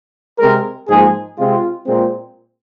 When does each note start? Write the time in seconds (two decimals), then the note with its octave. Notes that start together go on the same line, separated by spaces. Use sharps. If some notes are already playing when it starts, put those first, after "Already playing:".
0.39 C3 G#3 C4 A#4
0.88 G#2 F3 A#3 G#4
1.38 C3 G#3 C4 F4
1.87 A#2 G#3 C4